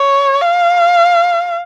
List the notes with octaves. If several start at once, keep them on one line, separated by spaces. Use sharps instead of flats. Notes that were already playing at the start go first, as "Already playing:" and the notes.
Already playing: C#5
F5